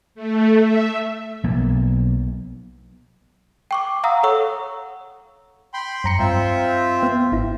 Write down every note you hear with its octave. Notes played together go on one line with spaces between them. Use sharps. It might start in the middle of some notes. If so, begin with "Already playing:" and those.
A3
E5
B1 A#3
G5 C#6 D6
F5 F#5 A#5 D#6 E6
A4 C#5 F#5 C#6 E6
G5 B5 C6
F#2 A#5 C#7
G2 C4 F4 E5
B3
G#1 E4